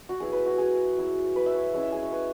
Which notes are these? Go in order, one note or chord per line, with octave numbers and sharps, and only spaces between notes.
F#4
F#3 B3 E4 G#4
B4
F#4
G#4
F#3 E4
B4
E5
C#5
G#3 C#4 E4 C#5
E5
G#4
C#5
B4